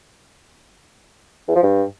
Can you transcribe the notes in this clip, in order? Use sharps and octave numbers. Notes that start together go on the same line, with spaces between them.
E2
F3
G2